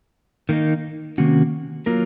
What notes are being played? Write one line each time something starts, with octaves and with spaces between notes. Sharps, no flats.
D#3 A#3 D#4
C3 D#3 A#3 C#4 F#4
F#3 A#3 F4 A#4